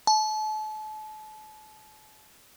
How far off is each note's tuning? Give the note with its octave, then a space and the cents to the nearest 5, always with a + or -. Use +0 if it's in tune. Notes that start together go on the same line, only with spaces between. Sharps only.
A5 -35